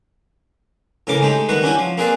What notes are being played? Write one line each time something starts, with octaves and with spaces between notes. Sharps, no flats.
A2 C#3 E3 A#4 D6
G#3 A3 D#4 G4
D#3 G3 B3 F#4 B4
C#4 D4 E4 F#4 G4
F3
A#3 C4 G#4 B4 D5